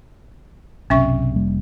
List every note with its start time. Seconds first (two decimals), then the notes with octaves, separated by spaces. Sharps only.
0.90 B1 F#2 C3 C#4 E5 C#6
1.36 F1 G3 A#3